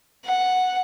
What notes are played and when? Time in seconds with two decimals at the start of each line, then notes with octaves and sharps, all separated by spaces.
0.25 F#5